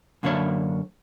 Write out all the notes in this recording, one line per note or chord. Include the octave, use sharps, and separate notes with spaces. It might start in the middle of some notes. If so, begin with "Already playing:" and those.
F#2 D3 A#3 D4 C#5 E5